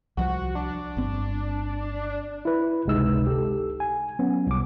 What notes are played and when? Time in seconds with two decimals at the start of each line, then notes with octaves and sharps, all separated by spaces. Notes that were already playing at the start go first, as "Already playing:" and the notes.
0.17 C2 F3 F#4
0.55 D4
0.97 G1 C4
2.45 E4 B4
2.86 G1 C#2 C3 G#3 D#4 E6
3.27 G4 A4
3.80 G#5
4.19 F#3 B3 C#4
4.47 C2 D6